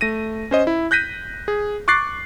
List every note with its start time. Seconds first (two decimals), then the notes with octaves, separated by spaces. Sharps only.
0.01 A3 A#6 D#7
0.51 C#4 C5 D#5
0.67 E4
0.91 F#6 G6 A#6 B6 D#7
1.48 G#4
1.88 C#6 D6 F#6 A6 C7